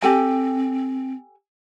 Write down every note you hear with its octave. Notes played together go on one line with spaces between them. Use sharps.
C4 G4 A4 G#5